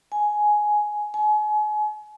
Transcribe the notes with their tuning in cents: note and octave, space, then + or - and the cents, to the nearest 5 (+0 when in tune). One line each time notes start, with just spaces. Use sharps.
G#5 +10
G#5 +35